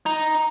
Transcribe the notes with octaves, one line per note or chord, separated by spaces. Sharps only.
D#4